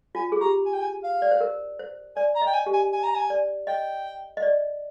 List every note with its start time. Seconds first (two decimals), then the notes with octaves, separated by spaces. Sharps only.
0.15 F4 G#5
0.32 G#4
0.41 G4 A#5
0.66 G#5
0.73 G5
0.81 G#5
1.04 F5
1.22 D5
1.31 C5
1.41 A#4
1.79 C5
2.16 D5 G#5
2.35 A#5
2.42 D#5
2.47 G5
2.54 G#5
2.66 G4
2.73 G#5
2.92 G#5
3.03 A#5
3.15 G#5
3.30 D5
3.67 D#5 G5
4.37 D#5
4.42 D5